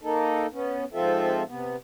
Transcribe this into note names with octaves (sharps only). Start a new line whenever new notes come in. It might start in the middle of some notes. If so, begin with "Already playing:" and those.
A#3 D#4 A4
B3 C#4
G#2 F3 C4 F4 A4 E5
C3 B3